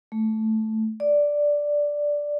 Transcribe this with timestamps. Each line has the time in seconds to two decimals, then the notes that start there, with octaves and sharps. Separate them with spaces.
0.12 A3
1.00 D5